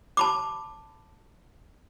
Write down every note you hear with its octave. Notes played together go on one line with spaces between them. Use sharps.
A5 B5 D6